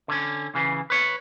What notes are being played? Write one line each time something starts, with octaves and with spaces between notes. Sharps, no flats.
D3 C#4
C#3 E3
B4 C#5